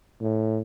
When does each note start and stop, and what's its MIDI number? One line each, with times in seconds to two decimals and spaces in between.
0.21 0.61 45